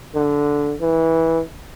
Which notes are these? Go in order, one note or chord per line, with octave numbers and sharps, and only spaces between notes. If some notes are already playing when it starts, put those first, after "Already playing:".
D3
E3